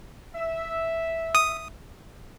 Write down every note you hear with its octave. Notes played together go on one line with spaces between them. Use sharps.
E5
D#6